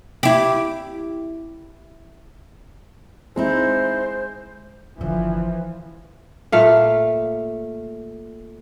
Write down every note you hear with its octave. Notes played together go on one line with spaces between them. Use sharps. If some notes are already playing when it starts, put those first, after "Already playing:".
E4 G4
G#3 C4 D#4 E4 C5
G1 D3 E3 F3
A#2 A3 F5